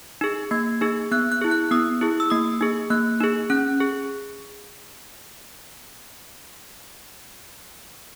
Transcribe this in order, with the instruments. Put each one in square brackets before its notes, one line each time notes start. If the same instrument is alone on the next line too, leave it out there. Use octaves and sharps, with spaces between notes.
[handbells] D#4 G#4
A#3 G#6
D#4 G#4
B3 F#6
F#6
E4 G#4
F#6
B3 D#6
E4 G#4
E6
A#3 D#6
D#4 G#4
A#3 F#6
D#4 G#4
C#4 F#6
G#4